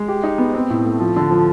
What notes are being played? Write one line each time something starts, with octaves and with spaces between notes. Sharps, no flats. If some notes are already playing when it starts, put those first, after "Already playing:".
Already playing: G#3
G4
D#4
B3
C4
A2
A3
F3
D3
F3